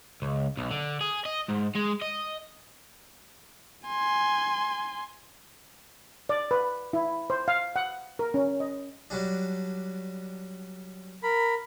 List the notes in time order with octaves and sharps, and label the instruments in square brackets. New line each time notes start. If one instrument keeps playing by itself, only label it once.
[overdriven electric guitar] C#2
B1
D3
G#4
D#5
G#2
G#3
D#5
[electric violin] G#5 C6
[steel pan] D5
B4
E4
C5
F5
F#5
A#4
C#4
D#5
[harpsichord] F#3 G3 D4
[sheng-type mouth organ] A#4 B5